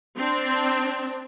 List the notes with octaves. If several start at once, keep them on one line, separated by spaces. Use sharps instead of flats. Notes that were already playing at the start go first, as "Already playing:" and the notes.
C4 D4